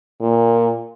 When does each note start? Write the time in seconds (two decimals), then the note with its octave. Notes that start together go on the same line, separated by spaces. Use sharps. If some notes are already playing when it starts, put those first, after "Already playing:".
0.22 A#2